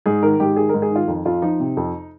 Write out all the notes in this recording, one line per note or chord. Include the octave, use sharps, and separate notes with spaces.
G#2 G#4
D#3 A#4
G#2 G4
D#3 G#4
G#2 A#4
G#4
D#3 F4
F2 D#4
F2 F4
F3 D#4
C3
F2